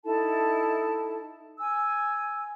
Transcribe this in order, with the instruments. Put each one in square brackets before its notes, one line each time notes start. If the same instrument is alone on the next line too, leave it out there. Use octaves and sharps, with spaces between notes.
[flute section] D#4 E4 A4 A5
G#5 E6